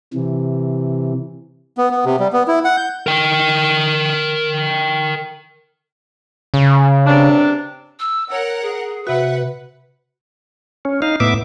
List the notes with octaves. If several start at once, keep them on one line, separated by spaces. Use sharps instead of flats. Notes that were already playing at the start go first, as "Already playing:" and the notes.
C3 E3
B3
B3
C3
G3
B3
E4
F#5
G6
A#4 G5
C#3
G2 C3 D4
E6
A#4 C#5 F#5
G#4
C3 F#4 B4 E5 F#5
C#4
D#4 F5
A2 B3 E5 D6